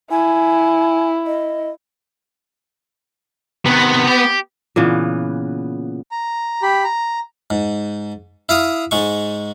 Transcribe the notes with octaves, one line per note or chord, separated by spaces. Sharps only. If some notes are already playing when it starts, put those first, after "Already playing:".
E4 G#5
D#5
C3 D#3 B3
G4
A#2 C#3 E3 B3
A#5
G4 B5
A#5
G#2
E4 F5 D#6
G#2 G#3 C#6